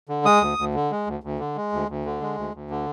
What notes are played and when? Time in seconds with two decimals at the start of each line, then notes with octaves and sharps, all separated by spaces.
0.09 D3
0.25 G#3 D#6
0.41 D2
0.58 D2
0.74 D3
0.91 G#3
1.07 D2
1.23 D2
1.40 D3
1.56 G#3
1.72 D2
1.89 D2
2.05 D3
2.22 G#3
2.37 D2
2.55 D2
2.70 D3